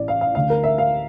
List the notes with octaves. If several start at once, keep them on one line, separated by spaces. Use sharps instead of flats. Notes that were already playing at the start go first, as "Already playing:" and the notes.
Already playing: A1 A2 E3 D5
F5
F5
D2 D3 F5
A#4
E5
F5